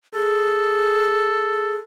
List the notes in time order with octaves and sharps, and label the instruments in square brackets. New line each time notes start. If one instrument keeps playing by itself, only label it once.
[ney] G#4 [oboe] A4